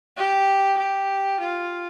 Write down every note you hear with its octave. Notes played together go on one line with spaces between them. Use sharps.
G4
G4
F4